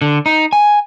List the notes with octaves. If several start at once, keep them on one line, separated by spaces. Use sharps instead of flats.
D3
D#4
G#5